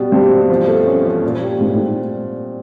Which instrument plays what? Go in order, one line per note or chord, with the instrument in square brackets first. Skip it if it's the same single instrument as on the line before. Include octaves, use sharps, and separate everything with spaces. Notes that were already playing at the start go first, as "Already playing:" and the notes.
Already playing: [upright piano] B2 G3
[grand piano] G2 [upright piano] C4
[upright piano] B2
F3
A3
C#4
F3
A#2
G3
[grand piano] G#2 [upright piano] C4
[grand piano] A2